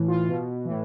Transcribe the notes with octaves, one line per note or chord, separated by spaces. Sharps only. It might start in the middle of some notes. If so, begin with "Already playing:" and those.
Already playing: A2 E3
F4
B2
A2 E3